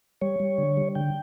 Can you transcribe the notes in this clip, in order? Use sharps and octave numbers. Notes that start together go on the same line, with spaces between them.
G3 C#5
G3
D3
G3
D3 G5